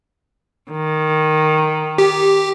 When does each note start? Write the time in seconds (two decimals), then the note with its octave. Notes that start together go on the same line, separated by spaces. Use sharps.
0.71 D#3
1.98 G4